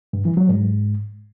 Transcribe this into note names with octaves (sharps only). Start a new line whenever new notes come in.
G2
E3
F#3
G#2